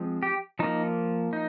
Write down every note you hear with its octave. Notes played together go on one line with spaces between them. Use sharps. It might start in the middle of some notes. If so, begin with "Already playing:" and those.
Already playing: F3 G#3 C4
G4
F3 A#3 D#4
D#4